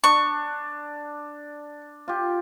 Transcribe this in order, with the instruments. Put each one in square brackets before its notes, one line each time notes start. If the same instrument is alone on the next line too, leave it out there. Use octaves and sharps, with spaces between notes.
[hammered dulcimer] D4 [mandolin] C#6
[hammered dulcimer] F4 G4